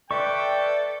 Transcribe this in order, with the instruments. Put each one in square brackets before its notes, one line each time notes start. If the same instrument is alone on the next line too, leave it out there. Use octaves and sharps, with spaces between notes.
[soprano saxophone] A4 [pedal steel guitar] B4 E5 C#6 [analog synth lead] D5 [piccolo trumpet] G5